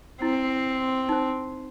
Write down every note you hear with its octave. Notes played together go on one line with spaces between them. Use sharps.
C4 E4
D#4 C5